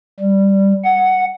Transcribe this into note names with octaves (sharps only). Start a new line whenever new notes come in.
G3
F#5